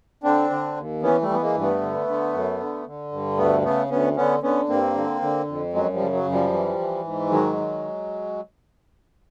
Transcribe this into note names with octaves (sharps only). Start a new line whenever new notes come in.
D3 C4 D4
D3
D#2
E3 B3 C#4
G3 A3
E3
B3
G#3 A#3
G2
A3 B3
D3
D3
F#2
D3
D3
G2
D2 A3 B3
C#3 A3 B3
D2 B3 C#4
D3 B3 C#4
D3 B3 C#4
G2 A#3 C4
D3
D3
F2
F#2 F#3 G#3
F3 G3
C#3
F#3
F#2
F3 G3
E3
E3
G#2
D#3 F#3 G#3
D#3